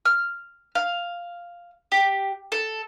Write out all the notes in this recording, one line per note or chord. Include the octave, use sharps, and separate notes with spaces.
F6
F5
G4
A4